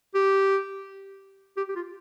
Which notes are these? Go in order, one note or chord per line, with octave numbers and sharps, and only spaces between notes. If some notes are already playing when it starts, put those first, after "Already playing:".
G4
G4
G4
F4